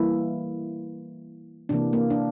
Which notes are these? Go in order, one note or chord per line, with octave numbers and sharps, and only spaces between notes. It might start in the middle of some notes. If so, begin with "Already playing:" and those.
Already playing: E3 G3 A#3 E4
C3 E3 A#3 D4
A#3
D4